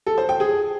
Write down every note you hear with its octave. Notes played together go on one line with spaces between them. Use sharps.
A4
C5
G5
G#4